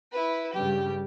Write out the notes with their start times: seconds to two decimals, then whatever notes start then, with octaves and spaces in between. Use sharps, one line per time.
0.12 E4 B4
0.53 G2 C#3 G3 G4